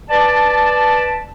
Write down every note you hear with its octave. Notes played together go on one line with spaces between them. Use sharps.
B4 D5 A5